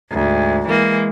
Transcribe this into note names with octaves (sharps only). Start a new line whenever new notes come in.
D2 G#2
E3 G#3 A#3